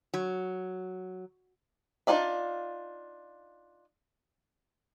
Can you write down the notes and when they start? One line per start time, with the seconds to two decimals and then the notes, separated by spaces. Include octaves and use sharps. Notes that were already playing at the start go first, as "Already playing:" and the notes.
0.14 F#3
2.07 D4 D#4 F4 D5 E5